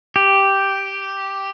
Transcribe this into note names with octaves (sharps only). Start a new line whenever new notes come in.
G4